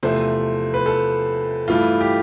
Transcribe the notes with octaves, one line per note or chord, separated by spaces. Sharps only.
E2 C3 F3 A3 C5
B4
A4
G2 E3 A3 F4
G4